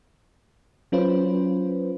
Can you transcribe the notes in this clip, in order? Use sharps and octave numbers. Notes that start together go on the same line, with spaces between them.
F#3 C#4 F4 B4 C5